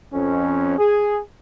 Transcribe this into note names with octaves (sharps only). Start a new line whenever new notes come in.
F2 C#4
G#4